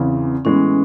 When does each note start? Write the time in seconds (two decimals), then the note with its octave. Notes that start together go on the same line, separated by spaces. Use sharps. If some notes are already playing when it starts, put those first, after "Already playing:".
Already playing: E2 C#3 E3 C4
0.45 A2 E3 G#3 B3 C#4